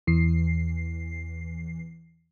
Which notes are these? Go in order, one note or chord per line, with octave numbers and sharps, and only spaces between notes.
E2 E3 C7